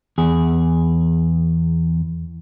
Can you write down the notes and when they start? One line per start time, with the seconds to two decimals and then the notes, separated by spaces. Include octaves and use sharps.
0.18 E2 G#4